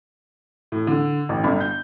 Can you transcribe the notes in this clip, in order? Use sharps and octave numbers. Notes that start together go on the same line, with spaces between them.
A2
D3
A1
G1
G6